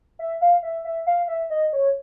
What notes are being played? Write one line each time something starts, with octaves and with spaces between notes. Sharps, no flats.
E5
F5
E5
E5
F5
E5
D#5
C#5